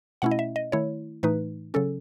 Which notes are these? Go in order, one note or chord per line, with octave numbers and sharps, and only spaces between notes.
B2 A3 C#4 E4 F#5
D#5
E5
D#5
D#3 A3 E4 C#5
A2 E3 A3 D#4 B4
C#3 F#3 C#4 A4